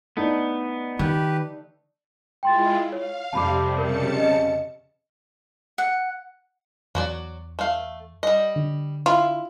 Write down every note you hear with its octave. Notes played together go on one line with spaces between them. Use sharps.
A3 B3 D4 D#4
D#3 G4 B4
G#3 E4 F4 G5 C6 A6
C#5 F5
F2 C3 G3 A5 B5 D6
C#3 A#4 A5 C#7
D#5
F#5
E2 F#3 F#4 D5
A3 F5
G3 D#5
D3
E4 F4